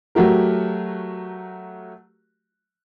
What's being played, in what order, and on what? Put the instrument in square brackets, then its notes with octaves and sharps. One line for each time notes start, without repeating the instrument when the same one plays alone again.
[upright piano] F#3 A3 F#4 G4 A#4